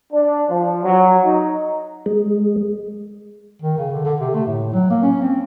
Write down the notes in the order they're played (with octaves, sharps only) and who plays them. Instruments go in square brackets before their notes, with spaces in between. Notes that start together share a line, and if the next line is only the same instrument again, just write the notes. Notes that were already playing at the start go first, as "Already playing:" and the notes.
[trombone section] D4
F3
F#3
D#4
[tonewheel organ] G#3
[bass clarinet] D#3
C#3
D3
D3
C3
A3
A2
F#3
A#3
C#4
C4